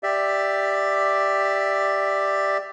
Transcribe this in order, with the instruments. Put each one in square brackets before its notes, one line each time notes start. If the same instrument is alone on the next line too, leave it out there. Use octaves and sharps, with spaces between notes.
[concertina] G4 D5 E5